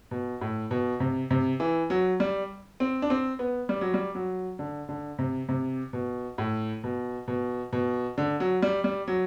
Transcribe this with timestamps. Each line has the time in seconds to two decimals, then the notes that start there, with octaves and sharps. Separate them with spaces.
0.11 B2
0.41 A2
0.71 B2
1.00 C3
1.31 C3
1.60 E3
1.90 F#3
2.20 G3
2.80 C4
3.02 D4
3.10 C4
3.39 B3
3.69 G3
3.81 F#3
3.94 G3
4.15 F#3
4.59 D3
4.89 D3
5.19 C3
5.49 C3
5.93 B2
6.38 A2
6.84 B2
7.28 B2
7.73 B2
8.18 D3
8.40 F#3
8.63 G3
8.84 G3
9.08 F#3